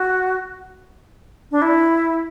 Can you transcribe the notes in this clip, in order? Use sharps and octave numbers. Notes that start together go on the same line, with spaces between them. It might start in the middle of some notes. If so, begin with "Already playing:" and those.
Already playing: F#4
D4
E4